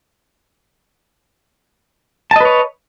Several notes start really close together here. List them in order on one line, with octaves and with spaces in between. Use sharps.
A5 D#5 B4 C#5